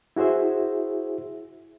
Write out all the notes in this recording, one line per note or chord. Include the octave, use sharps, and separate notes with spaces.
E4 F#4 G#4 C5 E5